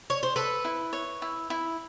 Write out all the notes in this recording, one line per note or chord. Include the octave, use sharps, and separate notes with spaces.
C#5
C5
A4 B4
E4
C#5
E4
E4